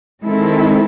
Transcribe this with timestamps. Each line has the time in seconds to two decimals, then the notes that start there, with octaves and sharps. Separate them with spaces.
0.24 D#3 G#3 C4 E4 A4